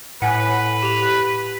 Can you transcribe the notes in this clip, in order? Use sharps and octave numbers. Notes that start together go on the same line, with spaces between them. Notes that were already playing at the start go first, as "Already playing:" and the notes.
A2 B4 F#5 G#5
G4 F7